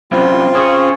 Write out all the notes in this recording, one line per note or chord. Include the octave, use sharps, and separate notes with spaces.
F#2 C3 C4 E4 F4
C#4 G#4